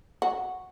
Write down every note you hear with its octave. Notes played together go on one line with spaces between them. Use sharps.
F#4